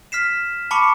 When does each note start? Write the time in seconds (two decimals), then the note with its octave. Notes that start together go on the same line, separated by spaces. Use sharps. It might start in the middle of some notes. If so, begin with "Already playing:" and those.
0.12 F6 B6 C7 E7
0.71 A5 B5 C#6 D6 C#7